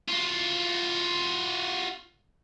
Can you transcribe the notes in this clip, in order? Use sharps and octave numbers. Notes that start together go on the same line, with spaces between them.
F4 F#4